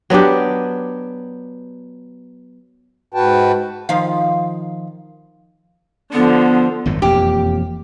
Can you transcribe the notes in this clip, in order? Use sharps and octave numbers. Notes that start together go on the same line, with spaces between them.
F#3 B3 D4 G4
G#2 F#4 B4 G5 A5
D#3 F3 F5
D3 F3 B3
G#1 F#2 A2
E1 F2 A#3 G4